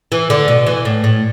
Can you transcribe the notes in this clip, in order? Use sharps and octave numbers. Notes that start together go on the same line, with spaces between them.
E3
D3
B2
E3
A2
A2